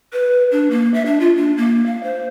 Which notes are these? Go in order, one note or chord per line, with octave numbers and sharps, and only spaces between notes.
B4
D4
A#3
E5
D4
F4
D4
A#3
F5
C5